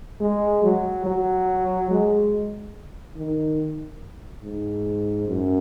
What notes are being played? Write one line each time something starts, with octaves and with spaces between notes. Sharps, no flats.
G#3
F#3
F#3
G#3
D#3
G#2
F#2